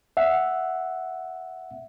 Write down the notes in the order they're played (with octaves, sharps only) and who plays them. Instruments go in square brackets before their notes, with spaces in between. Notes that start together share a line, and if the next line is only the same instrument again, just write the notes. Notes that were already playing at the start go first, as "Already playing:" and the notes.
[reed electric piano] E5 F#5